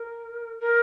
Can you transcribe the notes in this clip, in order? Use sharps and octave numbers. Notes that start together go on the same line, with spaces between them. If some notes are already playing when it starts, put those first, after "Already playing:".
Already playing: A#4
A#4